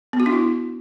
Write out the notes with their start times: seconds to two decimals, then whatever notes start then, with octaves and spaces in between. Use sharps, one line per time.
0.13 B3
0.20 F#4
0.26 D4
0.32 E4